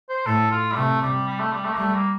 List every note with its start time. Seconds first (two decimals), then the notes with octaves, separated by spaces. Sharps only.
0.09 C5
0.26 A2 A4
0.51 F4
0.72 G3
0.76 C3 A3
1.02 G3
1.27 G3
1.39 A3
1.52 G3
1.64 A3
1.72 A#3
1.77 G3 A3
1.94 A#3